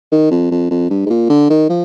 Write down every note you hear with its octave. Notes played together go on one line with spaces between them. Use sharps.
D#3
F2
F2
F2
G2
G#2
A#2
D3
D#3
F3